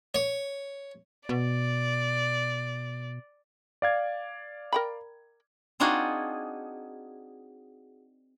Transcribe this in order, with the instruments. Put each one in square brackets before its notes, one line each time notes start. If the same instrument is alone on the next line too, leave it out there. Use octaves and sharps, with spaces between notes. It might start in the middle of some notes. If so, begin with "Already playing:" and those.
[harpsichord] C#5
[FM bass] B2 [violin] D5
[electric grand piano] D5 F5 G#6
[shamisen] A#4 G5 B5
[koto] C4 D4 D#4 F4 F#4 G#4